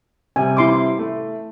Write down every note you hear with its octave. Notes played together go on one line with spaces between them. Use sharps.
C3 G3 G#5
E4 C6 D6
A3